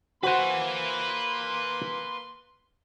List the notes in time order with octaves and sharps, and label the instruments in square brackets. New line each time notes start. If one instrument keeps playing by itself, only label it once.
[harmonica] A#3 C6 [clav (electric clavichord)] F#4 C5 F#5 [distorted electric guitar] B4 G#5